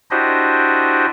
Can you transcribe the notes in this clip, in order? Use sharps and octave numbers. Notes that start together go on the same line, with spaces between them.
D4 E4 F#4 G4 C5 D#5